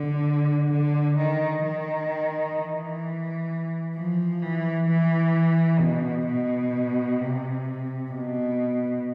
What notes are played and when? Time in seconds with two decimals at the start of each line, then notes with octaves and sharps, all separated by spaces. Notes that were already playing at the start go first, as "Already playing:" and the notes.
Already playing: D3
0.71 D3
1.18 D#3
1.65 D#3
2.57 E3
3.95 F3
4.42 E3
4.88 E3
5.80 B2
6.26 B2
7.20 C3
8.12 B2